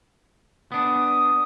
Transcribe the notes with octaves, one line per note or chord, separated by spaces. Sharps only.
B3 D4 D#6